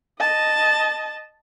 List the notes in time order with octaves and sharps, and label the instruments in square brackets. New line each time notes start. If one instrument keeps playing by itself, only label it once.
[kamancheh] D#5 A5